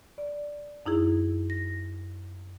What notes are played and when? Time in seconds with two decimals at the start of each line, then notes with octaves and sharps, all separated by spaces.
0.18 D5
0.86 F#2 D#4 E4 G#4
1.50 A#6